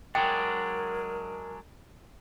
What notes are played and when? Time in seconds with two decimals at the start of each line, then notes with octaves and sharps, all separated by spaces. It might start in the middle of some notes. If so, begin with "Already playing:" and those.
0.15 F#3 G#3 D4 A#4 G5